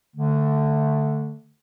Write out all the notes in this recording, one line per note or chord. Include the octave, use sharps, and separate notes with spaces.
D3 A3